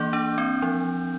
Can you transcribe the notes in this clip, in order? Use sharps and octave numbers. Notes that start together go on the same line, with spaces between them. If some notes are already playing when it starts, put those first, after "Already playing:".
Already playing: E3 A#3 D4 D6 G6
D4
C4
F3